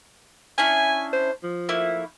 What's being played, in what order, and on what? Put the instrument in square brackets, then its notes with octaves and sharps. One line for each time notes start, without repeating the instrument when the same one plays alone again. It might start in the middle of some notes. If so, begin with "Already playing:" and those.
[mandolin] C#4 D4 E4 [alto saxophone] G#5
[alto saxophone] C5
F3
[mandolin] A3 A#3 E4